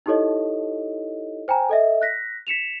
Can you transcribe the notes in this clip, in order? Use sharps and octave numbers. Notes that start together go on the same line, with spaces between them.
D#4 E4 G4 A4 C#5 D#5
C5 G5 G#5 A#5
A4 D#5 E5
F#6 A#6 B6
B6 C#7 E7 F7